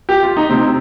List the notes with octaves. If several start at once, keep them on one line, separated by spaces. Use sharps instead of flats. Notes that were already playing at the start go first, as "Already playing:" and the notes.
G4
F4
D#4
C3 C4